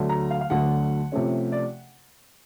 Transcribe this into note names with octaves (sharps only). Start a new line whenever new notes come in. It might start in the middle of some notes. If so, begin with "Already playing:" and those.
Already playing: D2 D3 F#3 A3
A#5
F5
F5
D2 D3 F#3 A3 F#5
C3 F3 A3 C#4
D5